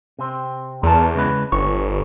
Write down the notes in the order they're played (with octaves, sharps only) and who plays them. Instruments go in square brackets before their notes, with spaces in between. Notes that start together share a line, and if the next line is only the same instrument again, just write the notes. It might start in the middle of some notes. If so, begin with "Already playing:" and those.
[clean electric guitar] C3 C4
[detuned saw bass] E2 [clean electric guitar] A#4 A5
[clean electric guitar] C#3 G#3 B4
[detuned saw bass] G1 [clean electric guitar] C#5